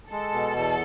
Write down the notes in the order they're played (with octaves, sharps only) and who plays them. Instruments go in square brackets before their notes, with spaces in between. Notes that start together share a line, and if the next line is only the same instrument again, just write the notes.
[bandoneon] G#3 [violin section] A4
[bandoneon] B2
E2